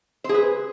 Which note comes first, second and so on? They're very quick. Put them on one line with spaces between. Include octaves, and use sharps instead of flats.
C5 G#4 B4